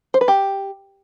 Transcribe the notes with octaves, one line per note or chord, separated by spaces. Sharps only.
C5
B4
G4